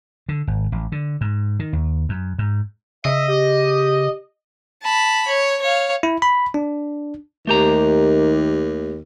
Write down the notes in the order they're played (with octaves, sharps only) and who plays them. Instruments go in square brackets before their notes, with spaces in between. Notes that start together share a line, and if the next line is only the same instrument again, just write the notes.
[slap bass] D3
G#1
A1
D3
G#2
D#3
D#2
F#2
G#2
[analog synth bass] C#3 [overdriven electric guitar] D#5 [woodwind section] E5
[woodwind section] G4
[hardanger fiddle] A5 B5
C#5
C#5 F5
[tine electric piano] E4
B5
D4
[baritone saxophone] D#2 [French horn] D#3 [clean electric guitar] A3 G4 A#5